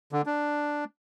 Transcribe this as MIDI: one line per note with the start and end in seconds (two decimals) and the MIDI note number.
0.12 0.22 50
0.26 0.84 62